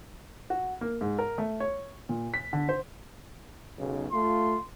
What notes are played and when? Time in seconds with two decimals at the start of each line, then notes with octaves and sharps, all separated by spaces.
0.50 F#4
0.81 A#3
1.01 G#2
1.19 A#4
1.38 A3
1.60 C#5
2.09 A#2
2.34 B6
2.53 D3
2.69 C5
3.78 B1 C#3
4.12 A3 F4 C6